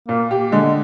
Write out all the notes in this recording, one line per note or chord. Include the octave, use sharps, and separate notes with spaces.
A#2 A#3
G4
D3 G#3